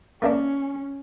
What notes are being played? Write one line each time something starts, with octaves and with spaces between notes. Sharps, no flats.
A3 A#3 C#4 D4